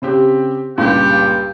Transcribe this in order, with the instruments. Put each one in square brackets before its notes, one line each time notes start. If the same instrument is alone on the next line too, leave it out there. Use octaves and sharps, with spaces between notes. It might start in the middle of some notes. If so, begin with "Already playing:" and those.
[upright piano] C#3 C4 G4
[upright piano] C#2 G2 A#2 [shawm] G4